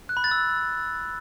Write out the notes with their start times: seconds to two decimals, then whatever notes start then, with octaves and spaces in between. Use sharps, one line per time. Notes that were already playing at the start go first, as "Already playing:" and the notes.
0.09 F#6
0.17 B5
0.24 A6
0.31 E6